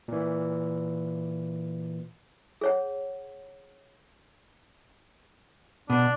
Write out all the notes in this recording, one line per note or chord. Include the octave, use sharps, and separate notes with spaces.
A#2 E3
G#4 C#5 F#5
B2 D4